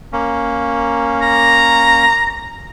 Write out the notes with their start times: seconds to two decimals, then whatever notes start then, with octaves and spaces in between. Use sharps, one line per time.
0.13 A#3 C#4
1.22 A#5